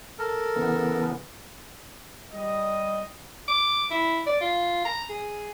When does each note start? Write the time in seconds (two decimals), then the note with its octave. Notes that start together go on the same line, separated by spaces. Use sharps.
0.19 A4 A#4
0.56 C#3 E3 B3
2.32 G3 D#5
3.48 D6
3.91 E4
4.26 D5
4.41 F4
4.85 A#5
5.09 G#4